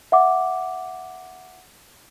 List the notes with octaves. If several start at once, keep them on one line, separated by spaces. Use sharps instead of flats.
E5 F#5 D6